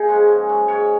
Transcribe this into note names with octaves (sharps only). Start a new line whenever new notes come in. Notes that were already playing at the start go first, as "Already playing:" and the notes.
Already playing: A#3 D#4 G#4
C#3 F3 G#3
G#2
F#3
G#2 C#5